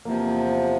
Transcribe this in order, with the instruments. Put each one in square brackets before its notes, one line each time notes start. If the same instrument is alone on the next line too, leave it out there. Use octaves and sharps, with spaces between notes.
[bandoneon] E2 C3 F3 [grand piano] A#3